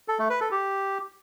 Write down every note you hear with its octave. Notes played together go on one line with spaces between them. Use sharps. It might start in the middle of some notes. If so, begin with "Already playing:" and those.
A4
A3
B4
A4
G4